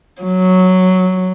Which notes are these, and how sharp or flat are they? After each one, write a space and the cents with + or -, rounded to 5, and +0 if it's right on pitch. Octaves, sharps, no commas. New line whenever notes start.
F#3 +0